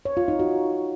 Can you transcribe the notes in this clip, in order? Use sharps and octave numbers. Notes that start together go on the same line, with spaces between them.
C#5
F4
D#4
F#4